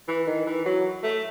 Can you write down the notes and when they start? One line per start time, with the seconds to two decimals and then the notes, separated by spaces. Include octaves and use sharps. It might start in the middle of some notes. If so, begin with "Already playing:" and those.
0.08 E3
0.27 D#3
0.46 E3
0.66 F#3
1.03 A3